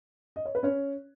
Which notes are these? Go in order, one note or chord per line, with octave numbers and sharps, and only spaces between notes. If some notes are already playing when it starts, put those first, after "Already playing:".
D#5
C#5
B4
C#4 C#5